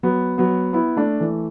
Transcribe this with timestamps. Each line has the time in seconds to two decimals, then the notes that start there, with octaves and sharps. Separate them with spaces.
0.03 F#3 B3
0.38 F#3 B3
0.73 B3 E4
0.97 A3 D4
1.20 E3 A3